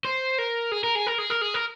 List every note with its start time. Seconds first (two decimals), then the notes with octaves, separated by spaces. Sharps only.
0.05 C5
0.38 A#4
0.72 G#4
0.84 A#4
0.96 G#4
1.07 A#4
1.18 G#4
1.30 A#4
1.42 G#4
1.54 A#4